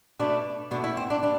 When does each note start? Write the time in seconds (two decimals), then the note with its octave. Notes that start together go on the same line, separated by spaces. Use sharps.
0.19 B2 A3 D4
0.71 B2 A3 D4
0.84 E4
0.97 C4
1.10 D4
1.23 G3 D4